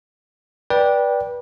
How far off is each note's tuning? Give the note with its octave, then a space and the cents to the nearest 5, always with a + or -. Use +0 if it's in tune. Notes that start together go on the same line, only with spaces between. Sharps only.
B4 -25 D5 -5 G5 +0